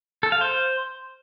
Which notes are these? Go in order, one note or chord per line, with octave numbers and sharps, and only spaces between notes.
A4
F5
C5